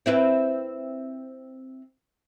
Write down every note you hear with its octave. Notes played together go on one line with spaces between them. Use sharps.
C4 E4 B4